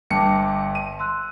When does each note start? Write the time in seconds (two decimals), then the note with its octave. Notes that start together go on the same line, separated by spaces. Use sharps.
0.10 G1 G2 G5 A5 D6 C#7
0.75 D#7
0.99 C6 E6 F#6